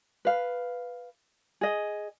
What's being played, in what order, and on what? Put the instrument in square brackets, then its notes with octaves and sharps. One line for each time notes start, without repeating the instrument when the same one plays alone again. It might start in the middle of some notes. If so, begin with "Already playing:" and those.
[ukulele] B4 F5
G#4 D#5